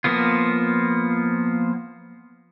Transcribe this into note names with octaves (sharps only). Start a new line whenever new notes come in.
F3 A#3 B3 F4